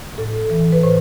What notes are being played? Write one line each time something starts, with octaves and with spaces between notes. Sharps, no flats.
A2 A4
E3
B4
A2 C5